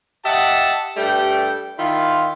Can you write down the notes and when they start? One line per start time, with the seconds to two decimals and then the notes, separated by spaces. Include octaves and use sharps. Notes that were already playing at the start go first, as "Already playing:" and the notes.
0.24 G4 D#5 E5 F#5 A5
0.96 G2 G3 A3 G4 G5
1.79 D#3 E4 F4